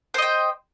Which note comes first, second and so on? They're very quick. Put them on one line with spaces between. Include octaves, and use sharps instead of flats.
C5 D#5 G5